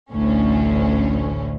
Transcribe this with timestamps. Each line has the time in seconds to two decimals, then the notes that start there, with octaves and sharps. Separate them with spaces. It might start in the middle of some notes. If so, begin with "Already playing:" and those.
0.12 A1 D2 A2 C#4